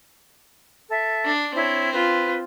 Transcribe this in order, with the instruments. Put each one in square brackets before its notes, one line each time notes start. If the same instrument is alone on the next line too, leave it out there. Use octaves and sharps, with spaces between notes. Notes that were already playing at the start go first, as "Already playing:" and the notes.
[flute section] A4 E5
[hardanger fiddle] D4
[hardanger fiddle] C4 [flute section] E4 C#5
[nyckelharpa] F4 [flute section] B4